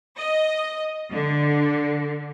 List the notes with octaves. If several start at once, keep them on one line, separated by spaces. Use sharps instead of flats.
D#5
D3